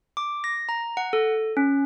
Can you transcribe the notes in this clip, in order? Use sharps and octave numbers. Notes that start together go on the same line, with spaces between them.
D6
A#6
A#5
F#5
A4
C#4